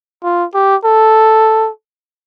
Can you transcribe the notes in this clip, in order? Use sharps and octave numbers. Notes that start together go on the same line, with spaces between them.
F4
G4
A4